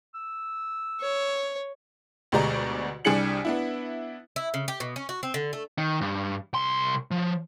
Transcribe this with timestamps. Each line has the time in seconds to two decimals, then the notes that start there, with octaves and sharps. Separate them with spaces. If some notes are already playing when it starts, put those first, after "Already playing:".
0.14 E6
1.01 C#5
2.32 D2 B2 G#3 G4 D5 A#5
3.05 C2 G3 D4 G#4 C#7 F#7
3.45 B3 D4 E4
4.36 E4
4.54 C#3
4.68 G4
4.80 B2
4.96 C#4
5.09 F#4
5.23 C4
5.34 D3
5.53 A3
5.78 D#3
6.01 G2
6.54 C2 C6
7.11 F3